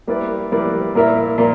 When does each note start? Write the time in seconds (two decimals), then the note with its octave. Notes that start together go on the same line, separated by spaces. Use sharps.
0.07 G3 A#3 E4 B4 D5
0.52 G3 A#3 E4 B4 D5
0.95 A#2 A#3 E4 A#4 E5
1.38 A#2 A#3